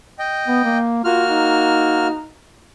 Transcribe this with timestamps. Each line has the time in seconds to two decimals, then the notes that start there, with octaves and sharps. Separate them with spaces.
0.19 D#5 G5
0.48 B3
0.64 A#3
1.04 A#3 F4 F#4 F6
1.29 D#4